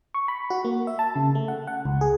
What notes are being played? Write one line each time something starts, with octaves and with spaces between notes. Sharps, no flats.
C#6
B5
F#4
A#3
E5
A5
C#3
A3
F#5
F#5
C#2
G#4